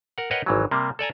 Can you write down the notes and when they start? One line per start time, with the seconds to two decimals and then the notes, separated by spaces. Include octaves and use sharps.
0.18 A#4 F#5
0.31 A#4 B4 C#5 D#5 F#5 G5
0.46 G#1 E3 F#3
0.71 C3 G3 A#3
0.99 A4 D5 G#5 A#5